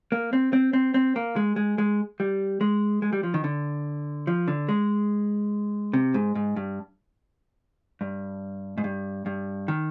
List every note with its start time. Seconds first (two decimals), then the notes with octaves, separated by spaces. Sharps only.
0.12 A#3
0.33 C4
0.53 C4
0.73 C4
0.94 C4
1.16 A#3
1.36 G#3
1.56 G#3
1.78 G#3
2.20 G3
2.61 G#3
3.02 G#3
3.13 G3
3.23 F3
3.34 D#3
3.44 D3
4.27 F3
4.48 D3
4.69 G#3
5.93 C3
6.14 G#2
6.35 G#2
6.56 G2
8.01 G2
8.78 G#2
8.84 G2
9.26 G2
9.68 D#3